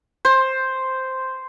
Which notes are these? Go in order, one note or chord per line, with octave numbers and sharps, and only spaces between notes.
C5